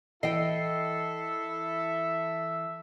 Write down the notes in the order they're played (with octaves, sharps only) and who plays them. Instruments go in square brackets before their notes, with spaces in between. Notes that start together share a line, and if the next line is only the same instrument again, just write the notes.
[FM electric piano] E3 C7 [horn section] E4 A4 [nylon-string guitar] D#5 G5 [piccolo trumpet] E5